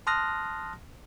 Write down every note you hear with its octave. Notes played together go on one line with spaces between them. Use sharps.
A5 C6 D#6 F6 F#6 A#6